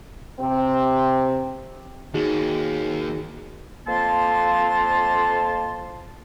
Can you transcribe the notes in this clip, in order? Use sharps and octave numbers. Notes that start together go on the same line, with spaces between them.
C3 C4
D#2 D#4 F#4 G#4
F2 A#3 A5 C6